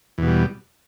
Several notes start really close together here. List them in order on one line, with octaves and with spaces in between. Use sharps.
E2 B2 G3